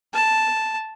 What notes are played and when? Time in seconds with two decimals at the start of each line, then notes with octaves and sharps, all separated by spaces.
0.13 A5